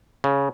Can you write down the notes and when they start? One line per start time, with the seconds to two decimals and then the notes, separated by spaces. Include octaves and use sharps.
0.24 C#3